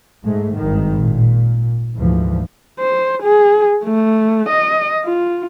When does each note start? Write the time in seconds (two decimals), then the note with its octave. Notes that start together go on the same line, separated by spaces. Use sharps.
0.24 G#2 G#3 A3
0.58 G#1 G2 D#3
0.97 A#2
1.96 D2 G#2 E3 F3
2.79 C5
3.23 G#4
3.84 A3
4.49 D#5
5.05 F4